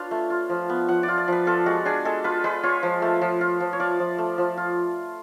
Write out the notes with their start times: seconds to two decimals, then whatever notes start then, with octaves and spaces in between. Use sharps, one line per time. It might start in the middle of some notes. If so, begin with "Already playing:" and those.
Already playing: D4 F4 B4 C#5 F5
0.11 A3
0.30 F4
0.49 F3
0.69 B3
0.88 F3 F#5
1.03 D5
1.08 F4
1.18 D5
1.28 F3 B4
1.47 F4 A4
1.66 G#3 F#4
1.85 D4 G#4
2.05 G#3 A4
2.24 F4 B4
2.44 G#3 B4
2.63 F4 C#5
2.83 F3
3.02 A3
3.22 F3
3.41 F4
3.60 F3
3.73 C#5
3.80 F4 D5
3.99 F3
4.18 A3
4.38 F3
4.57 F4